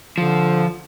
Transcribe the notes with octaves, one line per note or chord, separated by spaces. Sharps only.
D3 F3